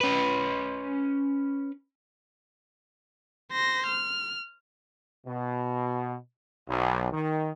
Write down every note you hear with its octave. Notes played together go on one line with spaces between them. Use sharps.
C#4 B4
C5 A#6
F6
B2
B1
D#3